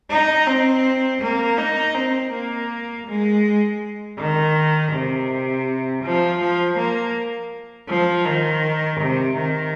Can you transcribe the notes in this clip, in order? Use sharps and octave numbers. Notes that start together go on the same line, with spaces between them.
D#4
C4
A#3
D#4
C4
A#3
G#3
D#3
C3
F3
F3
A#3
F3
D#3
C3
D#3